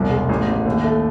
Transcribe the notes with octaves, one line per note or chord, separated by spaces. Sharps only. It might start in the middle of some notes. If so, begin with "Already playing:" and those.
Already playing: E1 C2
G#3
A1
A1
D#2
A3